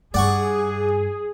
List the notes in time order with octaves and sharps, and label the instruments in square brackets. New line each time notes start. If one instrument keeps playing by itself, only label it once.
[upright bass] G2 [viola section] G#4 [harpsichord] D5 F#5 C#6